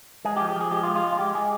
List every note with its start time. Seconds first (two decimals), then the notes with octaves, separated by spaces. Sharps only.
0.25 G#3 G#4
0.37 G4
0.41 F3
0.49 G4
0.56 F3 G#4
0.71 G#3 G4
0.83 F4
0.87 G#3
0.96 F4
1.03 G#3
1.12 F4
1.19 G#3 G4
1.34 G#3 G#4